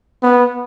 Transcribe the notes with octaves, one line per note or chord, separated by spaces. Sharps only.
B3